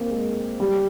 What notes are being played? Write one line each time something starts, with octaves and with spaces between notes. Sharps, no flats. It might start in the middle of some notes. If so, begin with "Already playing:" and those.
Already playing: A#3 C4
G#3
G3